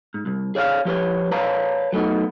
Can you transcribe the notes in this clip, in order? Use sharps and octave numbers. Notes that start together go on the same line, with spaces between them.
G#2
C2
G#4 C#5 D5 F5
F3 G4 B4 C#5
B4 C#5 D5 F5 A5 A#5
F#3 A3 B3 D#4